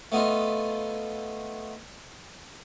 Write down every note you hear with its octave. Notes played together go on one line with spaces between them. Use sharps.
A3 B3 D#4 F4